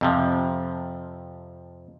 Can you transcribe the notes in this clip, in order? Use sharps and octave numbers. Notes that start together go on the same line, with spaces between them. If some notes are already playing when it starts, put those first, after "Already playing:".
F2 C3 F3